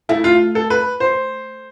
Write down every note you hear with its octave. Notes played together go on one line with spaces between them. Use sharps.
A3 E4
F4
A4
B4
C5